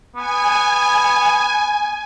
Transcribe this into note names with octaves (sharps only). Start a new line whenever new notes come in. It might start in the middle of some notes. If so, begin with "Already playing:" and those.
B3 G#5